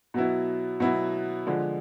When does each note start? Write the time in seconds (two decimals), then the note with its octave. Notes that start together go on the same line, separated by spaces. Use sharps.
0.14 B2 F#3 B3 E4
0.80 B2 F#3 B3 E4
1.47 D3 F3 G#3